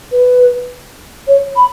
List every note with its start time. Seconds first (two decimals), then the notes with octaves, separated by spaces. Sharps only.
0.12 B4
1.27 C#5
1.56 B5